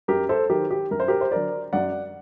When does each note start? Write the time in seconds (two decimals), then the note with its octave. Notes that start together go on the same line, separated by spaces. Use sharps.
0.08 F#2 G4 A#4
0.29 A4 C5
0.50 D#3 F#3 G4 A#4
0.71 G4
0.91 F#2 A#4
1.00 C5
1.08 G4 A#4
1.21 C5
1.32 D3 F#3 A#4 D5
1.73 F#2 D5 F#5